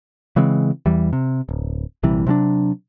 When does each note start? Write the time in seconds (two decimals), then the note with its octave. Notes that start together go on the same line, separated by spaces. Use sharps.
0.36 C#3 E3 G#3 C4
0.86 E2 E3 G3
1.13 C3
1.49 D1
2.03 A#1 C3 E3 G3
2.27 C3 F#3 C#4 D4